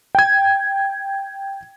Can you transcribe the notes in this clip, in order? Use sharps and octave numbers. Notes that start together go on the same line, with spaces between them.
G5 G#6